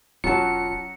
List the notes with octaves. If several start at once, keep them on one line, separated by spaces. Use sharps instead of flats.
E1 F#3 C#4 F4 F#4 A5 C#7